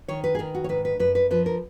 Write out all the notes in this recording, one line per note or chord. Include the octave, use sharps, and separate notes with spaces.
D#3 C#5
B4
G#4
D#3 A#4
F#4
C#5
G#2 B4
B4
F#2 B4
B4
F3 B4
A#4